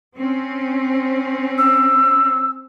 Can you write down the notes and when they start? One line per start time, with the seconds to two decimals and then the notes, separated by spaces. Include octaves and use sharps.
0.17 C4 C#4
1.57 E6